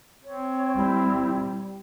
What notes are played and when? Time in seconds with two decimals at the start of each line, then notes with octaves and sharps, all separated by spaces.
0.24 C4 C#5
0.76 G3 E4